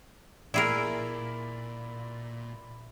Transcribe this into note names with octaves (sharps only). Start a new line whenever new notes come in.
A#2 E4 G#4 A#4 D5 E5 B5